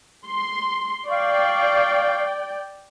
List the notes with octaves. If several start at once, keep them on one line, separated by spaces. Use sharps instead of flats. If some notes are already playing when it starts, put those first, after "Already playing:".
C6
D5 F5 G5 C#6